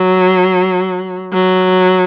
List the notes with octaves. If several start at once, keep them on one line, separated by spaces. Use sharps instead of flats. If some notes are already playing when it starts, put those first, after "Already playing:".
Already playing: F#3
F#3